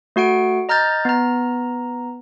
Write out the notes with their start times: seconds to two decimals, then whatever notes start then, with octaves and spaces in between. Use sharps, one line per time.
0.16 A3 F#4 F#5 D7
0.69 D#5 A#5 F6 G6 A6
1.05 B3 A#5